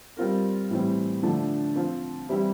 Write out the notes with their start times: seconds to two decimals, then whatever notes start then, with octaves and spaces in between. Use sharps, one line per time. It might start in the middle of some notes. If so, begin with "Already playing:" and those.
0.17 G3 C4 F4 A#4
0.70 A2 E3 G3 C4
1.23 D3 F3 A3 D4
1.76 F3 C4 F4 C5
2.29 E3 G3 C4 E4 G4